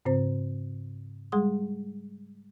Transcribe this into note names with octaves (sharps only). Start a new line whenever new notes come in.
G#2 C#3 C4 C5
G3 G#3 G#4 C6 D#6